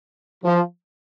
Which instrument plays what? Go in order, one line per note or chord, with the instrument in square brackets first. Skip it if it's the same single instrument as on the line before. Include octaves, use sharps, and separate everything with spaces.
[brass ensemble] F3